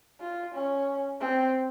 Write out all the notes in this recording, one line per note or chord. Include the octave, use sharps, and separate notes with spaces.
F4
C#4
C4